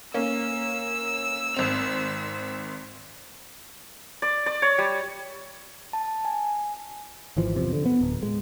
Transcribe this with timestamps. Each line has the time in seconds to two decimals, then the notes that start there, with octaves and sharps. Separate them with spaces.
0.14 A#3 C#4 E6
1.54 G#1 C4 F7
4.22 D5
4.46 D5
4.62 C#5
4.78 G3
5.93 A5
6.25 G#5
7.37 G#1 E3 F3
7.56 E2 C3 F3
7.73 D3
7.86 B3
8.01 D1
8.23 G#3